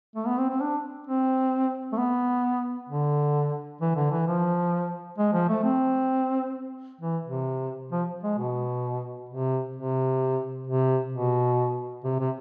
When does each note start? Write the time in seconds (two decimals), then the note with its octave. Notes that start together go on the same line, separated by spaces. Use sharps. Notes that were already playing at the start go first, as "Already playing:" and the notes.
0.15 A3
0.27 B3
0.38 C4
0.49 C4
0.61 D4
1.07 C4
1.92 A3
1.98 B3
2.89 D3
3.81 E3
3.96 D3
4.11 E3
4.27 F3
5.18 G#3
5.33 F3
5.49 A3
5.64 C4
7.01 E3
7.24 C3
7.92 F3
8.23 G#3
8.38 B2
9.29 C3
9.76 C3
10.67 C3
11.12 B2
12.04 C3
12.19 C3